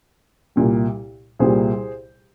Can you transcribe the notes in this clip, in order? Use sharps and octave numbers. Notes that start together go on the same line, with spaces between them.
C2 A#2 G3
C2 A#2 G3 G#4 C5